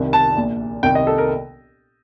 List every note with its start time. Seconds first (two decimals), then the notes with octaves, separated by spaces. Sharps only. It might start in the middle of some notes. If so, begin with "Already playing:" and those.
Already playing: C2 C3 D#3
0.13 A5
0.36 A#1 A#2
0.83 C2 C3 D#3 G5
0.95 D#5
1.07 A4
1.18 A#4